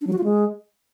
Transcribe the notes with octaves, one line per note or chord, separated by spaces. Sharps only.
D4
F#3
F#4
F4
G#3